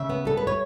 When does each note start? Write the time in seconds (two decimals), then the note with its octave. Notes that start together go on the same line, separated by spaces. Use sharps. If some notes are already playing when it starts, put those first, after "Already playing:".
Already playing: C#3 E5
0.09 B3
0.25 G3 A4
0.37 B4
0.47 C#5